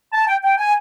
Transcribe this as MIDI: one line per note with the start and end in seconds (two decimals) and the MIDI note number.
0.13 0.27 81
0.28 0.37 79
0.43 0.55 79
0.58 0.73 80